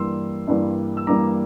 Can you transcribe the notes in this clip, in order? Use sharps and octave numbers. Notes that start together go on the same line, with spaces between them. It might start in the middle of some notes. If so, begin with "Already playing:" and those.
Already playing: G2 E3 G3 A#3 C6 E6
G2 E3 G3 A#3
E6
G2 E3 G3 A#3 A#5 D6